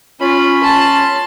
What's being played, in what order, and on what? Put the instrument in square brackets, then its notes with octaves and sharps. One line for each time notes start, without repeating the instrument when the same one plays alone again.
[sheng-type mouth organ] C#4 B5 [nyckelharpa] F4
[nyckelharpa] A5 C6